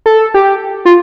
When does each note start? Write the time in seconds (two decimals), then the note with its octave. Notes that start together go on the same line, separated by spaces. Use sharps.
0.06 A4
0.34 G4
0.85 F4